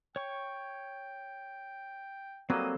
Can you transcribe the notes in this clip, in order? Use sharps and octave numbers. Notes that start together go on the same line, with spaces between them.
C#5 G5 C#6
F#3 G3 A#3 C4 A4 D#6